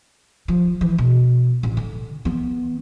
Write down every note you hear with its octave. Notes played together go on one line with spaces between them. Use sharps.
F3
E3
B2
A1
D3
E3 B3